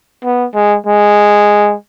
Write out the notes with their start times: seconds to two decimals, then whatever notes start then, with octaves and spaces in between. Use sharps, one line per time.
0.24 B3
0.55 G#3
0.86 G#3